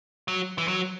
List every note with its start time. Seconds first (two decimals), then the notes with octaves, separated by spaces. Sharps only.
0.28 F#3
0.58 E3
0.68 F#3